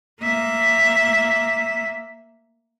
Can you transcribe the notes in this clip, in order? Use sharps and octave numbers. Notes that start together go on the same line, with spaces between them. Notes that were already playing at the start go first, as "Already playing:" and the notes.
A#3 E5